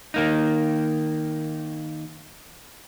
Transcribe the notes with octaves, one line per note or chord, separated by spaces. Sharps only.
D#3 A#3 D#4